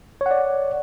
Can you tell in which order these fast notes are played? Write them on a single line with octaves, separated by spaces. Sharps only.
C#5 F#5 D5